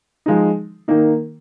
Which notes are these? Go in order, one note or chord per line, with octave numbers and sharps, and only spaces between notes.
F3 G#3 D#4
D#3 A#3 D#4